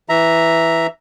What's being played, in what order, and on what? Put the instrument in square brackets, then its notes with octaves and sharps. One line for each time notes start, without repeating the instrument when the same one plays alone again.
[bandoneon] E3 E5 A#5